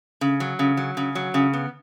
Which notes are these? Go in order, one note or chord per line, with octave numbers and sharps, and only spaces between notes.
C#3
F#3
C#3
F#3
C#3
F#3
C#3
B3